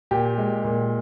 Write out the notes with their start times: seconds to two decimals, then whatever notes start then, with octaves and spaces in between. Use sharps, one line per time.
0.11 A#2 G4
0.38 G#3
0.65 A#2